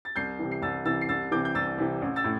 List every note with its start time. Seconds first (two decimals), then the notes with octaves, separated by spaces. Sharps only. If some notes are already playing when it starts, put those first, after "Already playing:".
0.05 A6
0.16 C2 G6 C7
0.39 C3 E3
0.52 C7
0.62 C2 E6 A6
0.85 C3 E3 E6 A6
1.01 C7
1.09 C2 E6 A6
1.31 C3 E3 D6 G6
1.45 G6
1.55 C2 E6 A6
1.78 C3 E3
2.02 A1
2.16 E6 A6
2.24 A2